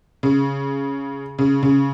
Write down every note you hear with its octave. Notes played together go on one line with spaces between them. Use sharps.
C#3
C#3
C#3